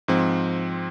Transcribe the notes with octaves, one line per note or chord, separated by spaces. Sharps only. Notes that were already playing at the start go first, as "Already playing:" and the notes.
G#2 F3 C4